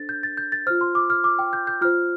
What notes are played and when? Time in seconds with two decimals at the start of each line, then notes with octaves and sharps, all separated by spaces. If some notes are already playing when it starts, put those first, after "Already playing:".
Already playing: D4 A4 C5 A6
0.09 G6
0.23 A6
0.37 G6
0.52 A6
0.66 F4 C5 F6
0.81 C6
0.95 D6
1.10 F6
1.24 D6
1.39 G5
1.53 G6
1.67 G6
1.81 F4 C5 F6